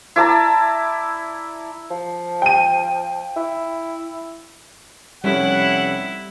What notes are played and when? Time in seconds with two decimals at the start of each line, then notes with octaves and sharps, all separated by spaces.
0.16 E4 D5 A5 A#5
1.91 F3
2.42 G5 D#7
3.36 E4
5.24 F1 G3 C#4 E4 F#5